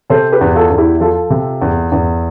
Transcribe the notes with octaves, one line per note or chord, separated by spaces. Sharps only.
C3 A4 C5
G4 B4
E2
F4 A4
E2
E4 G4
F3 F4 A4
C3
E2
E2